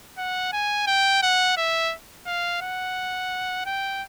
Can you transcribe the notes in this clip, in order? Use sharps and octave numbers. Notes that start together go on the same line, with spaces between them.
F#5
G#5
G5
F#5
E5
F5
F#5
G5